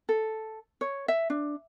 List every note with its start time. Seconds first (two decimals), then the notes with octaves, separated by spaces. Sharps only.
0.09 A4
0.81 C#5
1.08 E5
1.30 D4